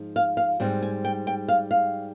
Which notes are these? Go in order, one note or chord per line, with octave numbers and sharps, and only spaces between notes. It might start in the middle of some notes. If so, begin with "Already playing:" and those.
Already playing: G#2 F3
F5
F5
G#2 G3 C4
G#5
G5
G5
F5
F5